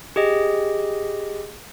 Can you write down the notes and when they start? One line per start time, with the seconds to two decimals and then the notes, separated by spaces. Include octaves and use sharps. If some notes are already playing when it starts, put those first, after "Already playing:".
0.16 G4 G#4 D#5